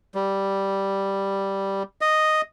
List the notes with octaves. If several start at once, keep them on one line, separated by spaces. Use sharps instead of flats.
G3
D#5